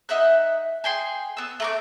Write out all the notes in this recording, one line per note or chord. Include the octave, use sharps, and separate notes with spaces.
D#4 E5 F#5 F#6
G#4 G5 C6
B3 E6
A3 A#5 D6